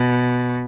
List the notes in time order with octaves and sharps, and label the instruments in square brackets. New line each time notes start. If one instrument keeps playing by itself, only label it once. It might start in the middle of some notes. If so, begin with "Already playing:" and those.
Already playing: [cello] B2